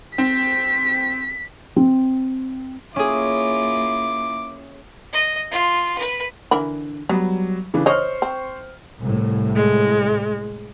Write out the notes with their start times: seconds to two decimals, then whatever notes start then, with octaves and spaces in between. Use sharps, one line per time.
0.18 C4 B6
1.76 C4
2.96 A#3 C#4 E4 F4 G#4 D6
5.13 D#5
5.52 F4
5.98 B4
6.51 D3 E3 A#4 B5
7.09 F#3 G3 B3
7.74 C#3 E3 D4
7.86 C5 C#5 D#5 C#6 F6
8.22 C4
9.00 C2 A2
9.55 G#3